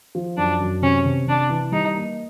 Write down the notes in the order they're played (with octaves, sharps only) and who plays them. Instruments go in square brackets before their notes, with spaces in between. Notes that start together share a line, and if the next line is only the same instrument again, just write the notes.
[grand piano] F3
[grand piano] F#2 [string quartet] D4
[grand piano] F#2
[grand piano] C3 [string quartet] C#4
[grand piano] C3
[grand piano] C3 [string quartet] D4
[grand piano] E3
[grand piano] G3 [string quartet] D#4
[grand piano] A#3